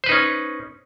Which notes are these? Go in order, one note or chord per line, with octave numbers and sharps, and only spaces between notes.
C#4 D#4 B4 C5